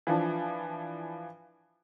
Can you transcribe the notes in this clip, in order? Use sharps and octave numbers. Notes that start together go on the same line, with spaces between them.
E3 F3 D4